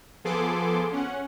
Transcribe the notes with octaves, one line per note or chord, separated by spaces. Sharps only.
F3 B3 G#4 A4 C6 D6
C#4 F#5